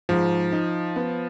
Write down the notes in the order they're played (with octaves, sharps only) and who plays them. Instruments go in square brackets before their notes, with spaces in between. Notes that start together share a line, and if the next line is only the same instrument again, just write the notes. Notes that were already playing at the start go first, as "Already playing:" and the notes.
[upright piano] G#2 [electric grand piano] F3
[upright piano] D#4
B3